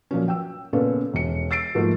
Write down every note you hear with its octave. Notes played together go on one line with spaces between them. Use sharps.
A#2 F3 F#3 C#4
G5 E6
A#2 C#3 B3 C#4 F4 A4
E1 C#7
E6 A6 C7 D7
G#2 F3 A3 A#3 F4